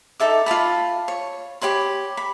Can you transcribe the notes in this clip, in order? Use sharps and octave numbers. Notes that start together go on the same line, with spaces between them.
D#4 A4 E5 D6
F4 B4 A5 B5
C#5
G4 C#5 B5 C6
B5